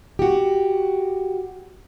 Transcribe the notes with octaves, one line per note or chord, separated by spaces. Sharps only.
F#4 G4